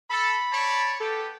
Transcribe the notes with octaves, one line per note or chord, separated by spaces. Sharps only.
A4 B5
C#5 D5 A5
B3 G4 A4